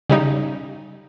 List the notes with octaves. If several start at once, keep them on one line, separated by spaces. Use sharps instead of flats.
C#3 G3 D#4